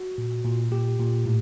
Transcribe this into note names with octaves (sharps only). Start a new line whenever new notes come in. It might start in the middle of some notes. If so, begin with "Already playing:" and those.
Already playing: F#4
A#2
A#2
A#2 G4
A#2
A2